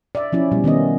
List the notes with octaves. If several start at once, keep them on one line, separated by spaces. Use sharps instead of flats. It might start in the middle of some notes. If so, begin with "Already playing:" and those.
D5 E5
F3 C#4 E4
B2 G3
D#3 B3 C#4 D#5